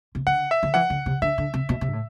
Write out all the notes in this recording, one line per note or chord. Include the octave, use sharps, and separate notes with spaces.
C3
D3 F#5
E5
D3
E3 F#5
D3
C3
D3 E5
D3
C3
B2
C3
A2